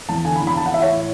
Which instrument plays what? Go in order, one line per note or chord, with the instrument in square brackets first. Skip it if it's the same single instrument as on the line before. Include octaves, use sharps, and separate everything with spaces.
[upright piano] E2 A5
D3 G#5
B5
E2
B5
E3 A5
F#5
E3 E5
C#5
A2